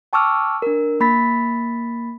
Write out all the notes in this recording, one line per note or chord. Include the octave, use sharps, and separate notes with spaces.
G5 A5 C#6 D6 E6 F6
D4 A#4
A#3 B5 A6 B6